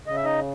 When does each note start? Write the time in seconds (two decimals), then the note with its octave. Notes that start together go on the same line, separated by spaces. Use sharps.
0.06 C#3 D#5
0.16 E5
0.24 D#4 D#5